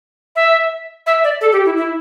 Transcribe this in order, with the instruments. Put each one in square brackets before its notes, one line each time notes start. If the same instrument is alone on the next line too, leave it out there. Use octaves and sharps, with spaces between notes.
[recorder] E5
E5
D5
A4
G4
E4
E4